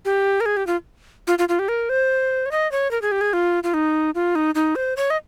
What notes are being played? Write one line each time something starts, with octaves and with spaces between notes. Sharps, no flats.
G4
A#4
G#4
G4
F4
F4
F4
F4
G4
A#4
C5
C#5
D#5
C#5
A#4
G#4
G4
G#4
F4
F4
D#4
F4
D#4
D#4
C5
C#5
D#5